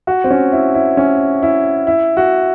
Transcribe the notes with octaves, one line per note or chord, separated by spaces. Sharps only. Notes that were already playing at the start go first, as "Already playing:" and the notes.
F#4
C4
C#4
E4
E4
C#4
E4
E4
F#4